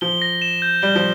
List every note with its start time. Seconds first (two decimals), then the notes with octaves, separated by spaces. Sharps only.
0.01 F3 G7
0.22 A#6
0.42 E7
0.62 G6
0.82 G3 G7
0.95 F3